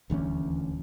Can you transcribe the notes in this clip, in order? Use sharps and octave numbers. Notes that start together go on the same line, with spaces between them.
D#1 D2 E3 C#4